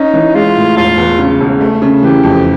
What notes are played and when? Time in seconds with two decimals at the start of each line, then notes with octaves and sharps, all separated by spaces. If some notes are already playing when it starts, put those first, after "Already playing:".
Already playing: C#4 D#4
0.14 E3
0.34 G#3 F4
0.57 A2
0.76 E1 F4
0.98 E2
1.19 C#3
1.40 E1
1.61 A3
1.82 C#3
2.02 E3 G4
2.23 F2